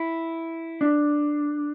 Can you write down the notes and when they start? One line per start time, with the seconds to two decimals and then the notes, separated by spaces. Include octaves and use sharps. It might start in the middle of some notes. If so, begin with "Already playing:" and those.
Already playing: E4
0.81 D4